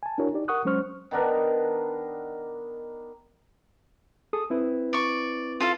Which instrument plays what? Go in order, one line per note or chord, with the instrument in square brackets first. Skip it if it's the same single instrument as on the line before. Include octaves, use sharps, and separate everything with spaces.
[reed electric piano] G#5 A5
D4 E4 F#4 A#4 C#5
D#4 G4 D5
A#4 F#5 C#6 D#6 F#6
F#3 G#3 C#4 C5 C#6 F6
[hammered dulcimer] D#3 B3 D4 A#4
[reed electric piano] G#4 A4 D#6
C4 E4 B4
[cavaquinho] D5 C#6
F4 A4 F5